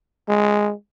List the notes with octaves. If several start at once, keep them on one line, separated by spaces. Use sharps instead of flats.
G#3